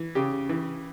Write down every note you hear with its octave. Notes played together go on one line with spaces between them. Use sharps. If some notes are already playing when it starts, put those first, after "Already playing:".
Already playing: E3
C#3 G4
E3